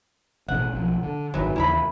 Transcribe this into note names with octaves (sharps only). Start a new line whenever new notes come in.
A1 B2 C#4 F#5
B1 F3
D3
G#1 F#2 D#3 E3 F#3
D#2 C#3 E3 E4 A#5 B5